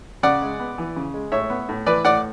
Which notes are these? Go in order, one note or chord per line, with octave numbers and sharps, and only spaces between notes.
C#3 D5 F#5
G#3
B3
E3
C#3
G#3
A2 C#5 E5
B3
A2
E3 B4 D5
A2 D5 F#5